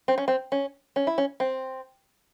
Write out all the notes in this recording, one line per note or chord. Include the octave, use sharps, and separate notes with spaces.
C4
C#4
C4
C#4
C#4
E4
C#4
C4